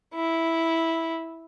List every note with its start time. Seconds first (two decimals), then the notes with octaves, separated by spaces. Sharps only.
0.15 E4